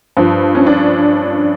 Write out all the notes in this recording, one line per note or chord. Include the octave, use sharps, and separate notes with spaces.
G2 F3
C#4
D4